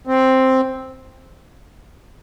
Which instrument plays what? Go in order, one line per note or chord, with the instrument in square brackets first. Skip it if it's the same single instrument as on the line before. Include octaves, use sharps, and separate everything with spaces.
[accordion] C4